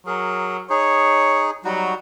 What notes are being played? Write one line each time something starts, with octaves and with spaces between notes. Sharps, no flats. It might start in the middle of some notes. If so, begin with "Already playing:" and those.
F#3 G#4 A#4
D#4 G#4 C#5
F#3 G3 D#4 F#4